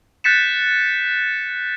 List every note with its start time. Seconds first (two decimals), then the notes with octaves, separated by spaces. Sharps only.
0.24 F#6 G6 A6 B6 C#7 E7